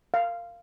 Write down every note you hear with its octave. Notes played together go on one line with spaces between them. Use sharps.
F5